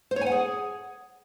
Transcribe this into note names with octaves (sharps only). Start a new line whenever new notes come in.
C5
C#5
G#5
F#5
G#4